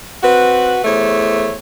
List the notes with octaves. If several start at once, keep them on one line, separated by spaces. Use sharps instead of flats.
C4 F#4 B4
E2 A3 C5 C#5